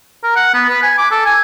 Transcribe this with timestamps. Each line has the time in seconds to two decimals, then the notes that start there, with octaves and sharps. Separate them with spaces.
0.23 A#4
0.36 F#5
0.54 B3
0.69 B4
0.83 G#5
0.98 D6
1.11 A4
1.26 G#5